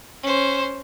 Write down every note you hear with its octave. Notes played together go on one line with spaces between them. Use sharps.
C#4 C5